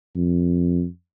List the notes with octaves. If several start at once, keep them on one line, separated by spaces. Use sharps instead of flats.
F2